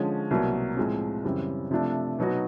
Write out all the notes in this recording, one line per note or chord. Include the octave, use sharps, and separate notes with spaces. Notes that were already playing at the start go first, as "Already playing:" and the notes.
Already playing: D3 F3 G#3 C#4
C2 B2 F#3 A#3
A2 F3 G#3 C4
F#2 C#3 E3 G3 C4
C3 F3 A3 D4
B2 F#3 B3 D#4 F#4